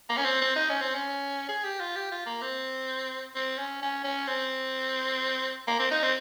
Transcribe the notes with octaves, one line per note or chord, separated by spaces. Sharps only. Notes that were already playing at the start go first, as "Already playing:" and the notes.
A#3
C#4
C4
C4
D#4
C#4
C4
C#4
G#4
G4
F4
G4
F4
A#3
C4
C4
C#4
C#4
C#4
C4
A#3
C4
D#4
C4